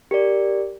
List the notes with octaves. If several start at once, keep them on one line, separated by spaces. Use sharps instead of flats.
G4 A#4 D5